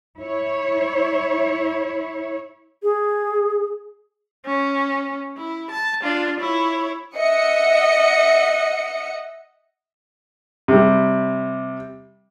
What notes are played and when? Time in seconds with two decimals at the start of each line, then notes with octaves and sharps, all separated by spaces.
0.20 E4 C#5
2.83 G#4
4.46 C#4
5.37 E4
5.71 A5
6.03 D4 F4
6.40 E4 C#5
7.15 D#5 E5 F#5 C#7
10.68 C3 G3